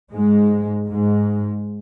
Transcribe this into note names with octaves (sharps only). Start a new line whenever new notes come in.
G#2 G#3
G#2 G#3